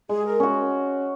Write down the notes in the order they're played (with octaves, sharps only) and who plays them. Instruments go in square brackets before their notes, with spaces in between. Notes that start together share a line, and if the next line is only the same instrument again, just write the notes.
[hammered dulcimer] G#3 [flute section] G#4
[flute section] A#4
[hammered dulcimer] C#4 F#4